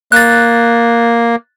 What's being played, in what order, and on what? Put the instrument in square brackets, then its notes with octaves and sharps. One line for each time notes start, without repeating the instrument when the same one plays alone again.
[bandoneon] A#3 [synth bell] F#6 A6